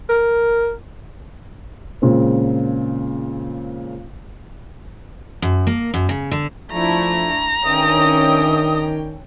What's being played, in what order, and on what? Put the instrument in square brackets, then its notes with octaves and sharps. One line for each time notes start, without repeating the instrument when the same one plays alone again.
[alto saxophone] A#4
[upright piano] A#2 C#3 G#3 C4
[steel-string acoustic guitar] F#2
A#3
F#2
C#3
D3
[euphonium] F3 [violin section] A3 D4 E4 [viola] A#5
[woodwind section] C#2 E5 D#6 [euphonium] D#3 [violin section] C#4 D4 G5